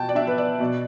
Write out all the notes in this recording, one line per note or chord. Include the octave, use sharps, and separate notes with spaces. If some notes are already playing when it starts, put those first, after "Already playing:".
Already playing: B2 G5 A5
D5
D4 E5
B4
D5
B2